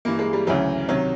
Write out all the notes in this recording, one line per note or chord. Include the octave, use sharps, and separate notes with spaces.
G2 E3 A#3
G#3
G3
D2 C#3 E3 F#3
C2 C3 D#3 F#3